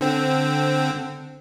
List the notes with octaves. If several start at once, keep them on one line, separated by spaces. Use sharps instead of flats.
D3 C4